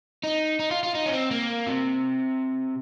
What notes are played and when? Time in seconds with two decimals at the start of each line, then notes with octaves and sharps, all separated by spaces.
0.24 D#4
0.60 D#4
0.71 F4
0.83 F4
0.95 D#4
1.06 C#4
1.12 C4
1.31 A#3
1.66 C3